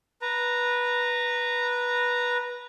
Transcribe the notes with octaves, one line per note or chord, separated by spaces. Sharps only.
B4 A#5